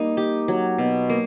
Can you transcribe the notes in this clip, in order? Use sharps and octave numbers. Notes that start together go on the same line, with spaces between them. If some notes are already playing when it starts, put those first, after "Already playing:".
Already playing: G3 A#3 D#4
G4
F#3
B2
A#3